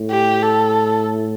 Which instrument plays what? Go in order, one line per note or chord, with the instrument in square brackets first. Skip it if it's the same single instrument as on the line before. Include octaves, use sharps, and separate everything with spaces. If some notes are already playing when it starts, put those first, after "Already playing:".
Already playing: [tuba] A2
[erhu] G4
A4